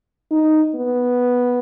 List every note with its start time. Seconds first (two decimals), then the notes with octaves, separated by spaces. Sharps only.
0.32 D#4
0.76 B3